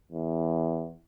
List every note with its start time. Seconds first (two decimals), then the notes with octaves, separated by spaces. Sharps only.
0.12 E2